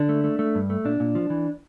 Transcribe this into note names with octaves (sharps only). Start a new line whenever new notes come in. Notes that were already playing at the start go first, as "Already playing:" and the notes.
Already playing: D3 D4
A3
A3
A3
G2
A3
A#2 D4
A#2
F3
E3